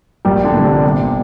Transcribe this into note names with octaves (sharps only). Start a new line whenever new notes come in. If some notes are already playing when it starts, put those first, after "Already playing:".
A#1 G3 G4
D3 D4
A#2
C3 C4
G1